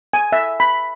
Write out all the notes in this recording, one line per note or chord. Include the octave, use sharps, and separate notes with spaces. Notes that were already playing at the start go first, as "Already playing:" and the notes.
G#5
E5
B5